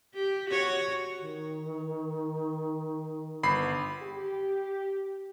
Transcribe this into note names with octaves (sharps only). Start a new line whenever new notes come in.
G4
F#4 C#5
D#3
G1 B5 C7
G4